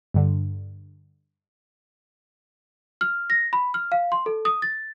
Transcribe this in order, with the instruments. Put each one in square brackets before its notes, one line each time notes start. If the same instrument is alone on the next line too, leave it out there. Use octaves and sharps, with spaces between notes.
[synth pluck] G2 D3
[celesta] F6
A#6
B5
F6
F5
C6
A4
D#6
A6